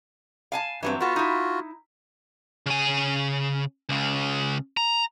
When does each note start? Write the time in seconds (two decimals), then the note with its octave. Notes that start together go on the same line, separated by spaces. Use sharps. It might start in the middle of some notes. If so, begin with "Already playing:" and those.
0.52 F5 G#5 A5
0.83 G2 E3 F#3 C4
1.00 B3 F4 F#4 A4
1.16 D#4 E4
2.66 C#3 G#5
3.89 C#2 C#3
4.77 A#5